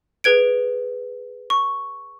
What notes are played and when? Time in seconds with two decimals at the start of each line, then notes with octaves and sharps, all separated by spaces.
0.24 G#4 B4 G#6 D7
1.50 C#6